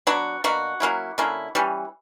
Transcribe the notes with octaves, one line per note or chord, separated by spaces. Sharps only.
F#3 B3 D4 F#4
B2 A#3 D4 F#4
F#3 A#3 C#4 E4
D3 A#3 C#4 E4
E3 G3 C#4